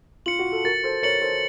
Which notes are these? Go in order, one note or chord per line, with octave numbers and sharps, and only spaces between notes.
F4 C#7 F#7
F#4
A4
F#4 A#4 A6
A4 C5
A#4 C#5 C#7 F#7
A4 C5